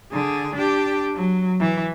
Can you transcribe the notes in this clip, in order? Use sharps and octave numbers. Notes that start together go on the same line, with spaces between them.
D3 G#4
D4 G4
F#3
E3